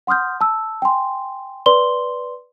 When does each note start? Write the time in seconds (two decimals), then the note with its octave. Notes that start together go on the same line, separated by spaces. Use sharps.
0.07 F#5 C6 D#6 F6 G6
0.41 A5 E6
0.82 G5 G#5 C6
1.66 B4 D5 C6 G7